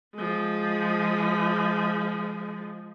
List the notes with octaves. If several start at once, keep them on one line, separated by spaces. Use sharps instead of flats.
F3 G#3